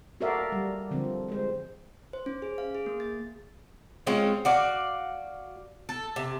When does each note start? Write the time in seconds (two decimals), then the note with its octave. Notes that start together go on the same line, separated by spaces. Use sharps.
0.21 F#4 A4 A#4 D5 E5 F5
0.52 G3
0.91 D3 F3 C4
1.28 G#3 C5
2.13 C5
2.26 C#4
2.42 G#4
2.58 F5
2.75 G#4
2.86 A#3
3.00 A6
4.06 G#3 C4 C#4 F4
4.45 F#4 D5 F5
5.89 A4
6.16 C3